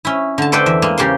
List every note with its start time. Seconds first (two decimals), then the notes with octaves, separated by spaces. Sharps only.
0.05 C#4 E4
0.38 D3 A5
0.52 A4 B4 C5 D5 E5 G5
0.66 E2 E5
0.82 G#3 A#3
0.98 C#3 G4 C5 C6